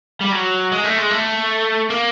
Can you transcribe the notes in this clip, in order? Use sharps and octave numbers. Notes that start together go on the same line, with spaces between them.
G3
F#3
G#3
A3
G#3
A3
A#3